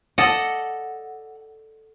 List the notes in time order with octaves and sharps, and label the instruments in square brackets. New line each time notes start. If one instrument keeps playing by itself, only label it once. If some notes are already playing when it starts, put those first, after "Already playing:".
[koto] A4 D5 D#5 [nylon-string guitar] F#5